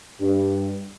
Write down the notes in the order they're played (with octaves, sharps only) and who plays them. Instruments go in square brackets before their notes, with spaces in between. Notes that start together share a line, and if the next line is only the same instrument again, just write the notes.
[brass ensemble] G2